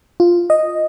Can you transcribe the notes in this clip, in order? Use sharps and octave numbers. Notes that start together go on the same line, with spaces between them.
F4
D#5